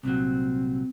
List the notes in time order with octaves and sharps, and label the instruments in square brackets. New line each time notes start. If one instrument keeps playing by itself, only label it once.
[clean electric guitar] C2 A#2 F#3 [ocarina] C4